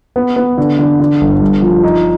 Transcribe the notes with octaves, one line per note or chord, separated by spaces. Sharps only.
B3
B3
D3
D3
D3
G1
G2
F3
D#4